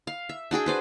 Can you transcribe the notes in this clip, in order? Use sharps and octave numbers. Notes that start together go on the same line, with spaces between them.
F5
E5
D4 F#4 G#4 G5
B4 C5 D5